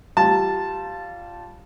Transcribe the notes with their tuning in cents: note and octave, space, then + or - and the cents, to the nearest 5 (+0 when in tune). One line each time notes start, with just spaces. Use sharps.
G3 -20 F4 +0 A5 +0